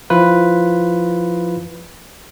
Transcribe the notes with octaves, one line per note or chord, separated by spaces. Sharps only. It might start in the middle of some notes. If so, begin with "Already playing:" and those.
F3 E4 F4 B4